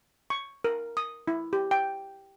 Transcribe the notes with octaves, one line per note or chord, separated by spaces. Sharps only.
C#6
A#4
D#6
E4
G4
G5